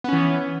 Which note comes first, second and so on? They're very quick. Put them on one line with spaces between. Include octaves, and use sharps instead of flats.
B3 C#4 E3